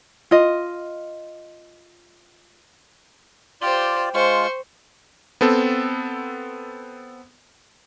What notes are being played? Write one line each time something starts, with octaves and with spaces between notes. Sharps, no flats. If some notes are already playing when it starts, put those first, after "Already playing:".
F4 D#5
F4 G4 C5 D5
G#3 F4 C5 C#6
B3 C4 A4